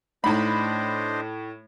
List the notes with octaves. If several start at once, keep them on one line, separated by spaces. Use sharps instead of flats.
A2 A3 D4 D#4 C5 D#5 A#5 B5